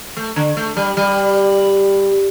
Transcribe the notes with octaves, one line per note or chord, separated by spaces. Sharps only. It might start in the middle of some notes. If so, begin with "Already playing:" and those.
A3
D3
A3
G3
G3